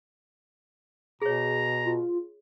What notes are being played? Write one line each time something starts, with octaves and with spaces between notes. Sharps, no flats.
B2 G#4 C#5 A#5
F4